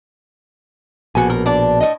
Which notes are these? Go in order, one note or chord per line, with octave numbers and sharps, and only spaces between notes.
A#1 B2 F#4 G#5
A#4
D4 D5
A2 D#5